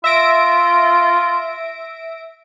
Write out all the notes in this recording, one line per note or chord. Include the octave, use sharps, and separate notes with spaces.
F4 E5 A#6 D7